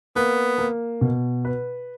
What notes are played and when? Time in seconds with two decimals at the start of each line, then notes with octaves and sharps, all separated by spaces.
0.16 A#3 B3
0.58 A#3
1.01 B2
1.45 B4